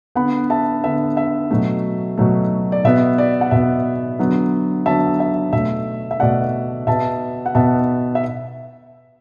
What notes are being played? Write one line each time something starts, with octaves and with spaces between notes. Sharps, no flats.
D3 B3 F#5 B5
E5 A5
D3 B3 E5
E5
B2 F#3 A3
B2 F#3 A3
D5
B2 B3 E5
D5
F#5
B2 B3 E5
D3 F#3 B3
D3 F#3 B3 E5 A5
E5
B2 A3 E5
E5
B2 A3 D5 F#5
B2 B3 E5 A5
F#5
B2 B3 E5 A5
E5